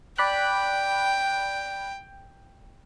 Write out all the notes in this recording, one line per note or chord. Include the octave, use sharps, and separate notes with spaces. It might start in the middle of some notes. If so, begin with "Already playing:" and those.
D5 G5 B5 F#6